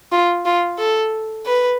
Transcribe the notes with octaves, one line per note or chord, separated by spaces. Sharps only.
F4
F4
A4
B4